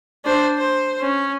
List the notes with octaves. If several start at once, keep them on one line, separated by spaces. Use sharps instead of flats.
D4 C5
C5
C#4